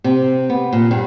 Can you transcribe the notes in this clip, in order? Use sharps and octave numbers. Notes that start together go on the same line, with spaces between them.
C3
B3
A#2
G2